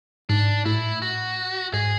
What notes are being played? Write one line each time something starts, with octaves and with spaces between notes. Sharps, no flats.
G#2 D4
A2 E4
F#4
G#2 G#4